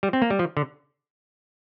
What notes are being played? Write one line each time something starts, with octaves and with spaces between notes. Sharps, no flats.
G3
C4
A#3
G3
F3
D3